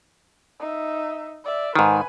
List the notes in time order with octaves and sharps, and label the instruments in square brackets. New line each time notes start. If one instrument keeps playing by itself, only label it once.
[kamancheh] D#4 E5
D5 E5
[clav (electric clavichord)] G#2 D#3 [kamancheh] B4 G#5